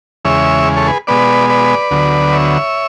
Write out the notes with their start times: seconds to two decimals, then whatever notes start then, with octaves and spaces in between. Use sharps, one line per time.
0.25 E2 C#3 G#3 C#5 E5
0.76 A4 C#5
0.87 G#4 B4
1.07 B2 G#3 B3 B4 D5
1.50 B4 D5
1.91 D2 D3 F#3 B3
2.32 C#5 E5